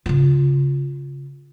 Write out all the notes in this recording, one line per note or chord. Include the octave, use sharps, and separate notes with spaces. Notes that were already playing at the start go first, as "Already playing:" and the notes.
C#3 F4